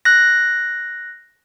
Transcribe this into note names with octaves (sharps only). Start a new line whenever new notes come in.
F#6 A#6